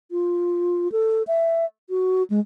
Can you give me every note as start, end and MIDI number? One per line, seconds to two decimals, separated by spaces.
0.11 0.91 65
0.92 1.23 69
1.27 1.65 76
1.90 2.23 66
2.30 2.40 56